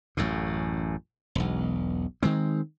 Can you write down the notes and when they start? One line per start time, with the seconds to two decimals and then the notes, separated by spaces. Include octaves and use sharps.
0.17 A1 F#2 A2
1.35 E1 B1
2.23 D#3 G#3 C4